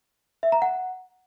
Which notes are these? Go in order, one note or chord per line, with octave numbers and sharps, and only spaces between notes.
E5
A#5
F#5